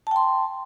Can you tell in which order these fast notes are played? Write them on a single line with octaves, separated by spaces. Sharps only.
A5 G5 C6